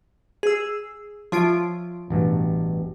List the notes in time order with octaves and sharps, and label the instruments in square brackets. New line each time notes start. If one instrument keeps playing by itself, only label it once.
[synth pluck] G#4 E6
[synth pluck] F3 F4 D7 [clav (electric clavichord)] C#5 E5
[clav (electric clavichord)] A1 G2 B2